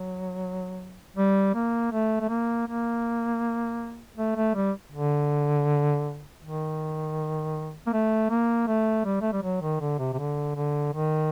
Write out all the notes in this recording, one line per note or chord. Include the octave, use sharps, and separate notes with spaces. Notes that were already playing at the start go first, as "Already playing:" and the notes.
Already playing: F#3
G3
A#3
A3
A3
A#3
A#3
A3
A3
G3
D3
D#3
A#3
A3
A#3
A3
G3
A3
G3
F#3
D#3
D3
C3
C3
D3
D3
D#3